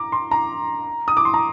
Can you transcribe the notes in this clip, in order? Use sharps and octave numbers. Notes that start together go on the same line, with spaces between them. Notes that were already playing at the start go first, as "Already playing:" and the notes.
Already playing: A#5 D6
C6
A#5
D#6
D6
C6
A#5